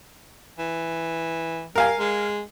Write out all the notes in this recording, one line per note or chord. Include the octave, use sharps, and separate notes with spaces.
E3
G3 A#4 F5 G#5
G#3